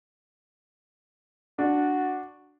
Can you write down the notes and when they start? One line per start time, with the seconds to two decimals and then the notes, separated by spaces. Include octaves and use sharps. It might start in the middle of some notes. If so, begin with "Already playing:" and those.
1.59 D4 F#4